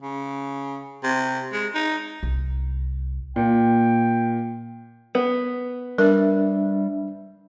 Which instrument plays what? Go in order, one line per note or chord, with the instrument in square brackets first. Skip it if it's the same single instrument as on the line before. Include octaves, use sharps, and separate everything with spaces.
[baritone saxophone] C#3
C3
G#3
D#4
[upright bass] C2
[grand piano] A#2 [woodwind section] G5
[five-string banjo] B3
[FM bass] G3 [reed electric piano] D4 E5 [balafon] A#4